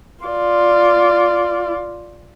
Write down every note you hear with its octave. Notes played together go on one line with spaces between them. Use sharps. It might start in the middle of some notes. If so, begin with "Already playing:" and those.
F4 D5